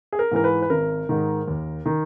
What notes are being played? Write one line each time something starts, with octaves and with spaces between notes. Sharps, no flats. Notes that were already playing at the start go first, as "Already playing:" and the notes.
G#4
A#4
G#2 E3 A#4
B4
B4
G#1 A#4
G#2 D#3
D#2
D#3